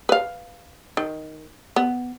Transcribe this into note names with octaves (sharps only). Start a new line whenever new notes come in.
B4 F5
D#3
B3